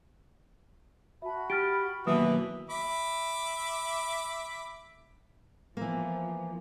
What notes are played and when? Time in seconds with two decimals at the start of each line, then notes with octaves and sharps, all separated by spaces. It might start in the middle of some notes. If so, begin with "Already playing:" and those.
1.22 F#4 E5 A5 B5
1.50 G4 F6 A6 D7
2.07 D#2 B2 E3 F#3 A#3 D#6
2.70 E5 B5 D6
5.77 E3 F3 A#3